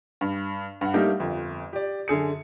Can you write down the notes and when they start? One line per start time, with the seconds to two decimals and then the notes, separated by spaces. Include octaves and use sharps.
0.21 G2
0.81 G2 F#5
0.94 G3 A3 A#3 D4 D#4 G4
1.19 G1 F2
1.73 G4 D5
2.08 F#2 D3 G#4 C#7